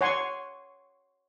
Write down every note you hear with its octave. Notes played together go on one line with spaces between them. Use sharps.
C#5 F#5 G#5 C6 C#6